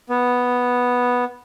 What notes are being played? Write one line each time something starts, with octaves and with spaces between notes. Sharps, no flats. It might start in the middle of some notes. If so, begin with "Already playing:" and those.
B3